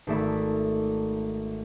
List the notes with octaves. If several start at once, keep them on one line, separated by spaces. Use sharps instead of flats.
G#1 A3 D5 E5 B5